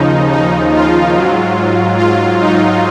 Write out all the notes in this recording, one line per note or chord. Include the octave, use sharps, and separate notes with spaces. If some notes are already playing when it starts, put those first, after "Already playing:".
Already playing: D#2 C#3 F3 D#4
D#4
F4
G#2 F#3
F4
D#4